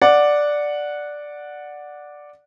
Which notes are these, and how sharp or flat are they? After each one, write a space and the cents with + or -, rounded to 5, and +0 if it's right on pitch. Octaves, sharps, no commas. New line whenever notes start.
D5 +0 F#5 -10